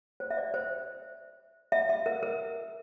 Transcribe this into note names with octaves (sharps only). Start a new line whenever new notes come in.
C5
E5
D5
C5
E5
E5
A#4
A#4